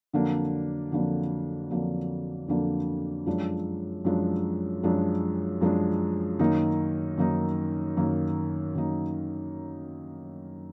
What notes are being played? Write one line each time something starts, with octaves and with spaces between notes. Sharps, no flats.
F2 D3 F#3 A#3 D4
F2 D3 F#3 A#3 D4
F2 D3 F#3 A#3 D4
F2 D3 F#3 A#3 D4
F#2 F3 G#3 D4
F#2 F3 G#3 D4
F#2 F3 G#3 D4
F#2 F3 G#3 D4
F#2 D#3 A#3 D#4
F#2 D#3 A#3 D#4
F#2 D#3 A#3 D#4
F#2 D#3 A#3 D#4